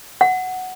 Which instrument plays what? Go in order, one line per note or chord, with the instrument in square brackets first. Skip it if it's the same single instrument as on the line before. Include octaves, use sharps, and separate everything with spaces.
[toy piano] F#5